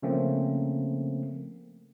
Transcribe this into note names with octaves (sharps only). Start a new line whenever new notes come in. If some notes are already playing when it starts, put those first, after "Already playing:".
C#3 F3 A3 A#3 C4 C#4